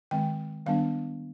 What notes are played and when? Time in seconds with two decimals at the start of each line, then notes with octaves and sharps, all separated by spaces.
0.11 D#3 G#3 C4 G5
0.66 D#3 G3 B3 D4 F5